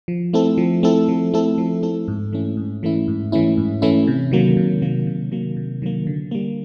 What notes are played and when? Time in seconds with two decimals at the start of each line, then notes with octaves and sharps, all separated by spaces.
0.08 F3
0.33 A3 C4 E4 A4
0.58 F3
0.83 A3 C4 E4 A4
1.08 F3
1.33 A3 C4 E4 A4
1.58 F3
1.83 A3 C4 E4 A4
2.08 G#2
2.32 E3 A3 C#4 E4
2.57 G#2
2.83 E3 A3 C#4 E4
3.08 G#2
3.32 E3 A3 C#4 E4
3.57 G#2
3.82 E3 A3 C#4 E4
4.07 C3
4.31 D#3 F#3 A#3
4.57 C3
4.82 D#3 F#3 A#3
5.07 C3
5.31 D#3 F#3 A#3
5.57 C3
5.82 D#3 F#3 A#3
6.07 D3
6.31 G3 A#3